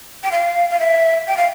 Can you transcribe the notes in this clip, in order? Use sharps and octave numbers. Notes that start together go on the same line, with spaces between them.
G5
F5
F5
E5
G5
F5